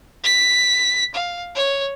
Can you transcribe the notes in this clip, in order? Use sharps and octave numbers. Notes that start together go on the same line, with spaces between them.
B6
F5
C#5